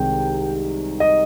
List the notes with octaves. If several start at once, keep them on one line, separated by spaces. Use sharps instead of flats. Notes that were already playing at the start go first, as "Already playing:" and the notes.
Already playing: C2 C3 D#3 G#3 G5
D#5